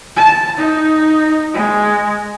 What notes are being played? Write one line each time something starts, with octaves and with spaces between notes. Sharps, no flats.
A5
D#4
G#3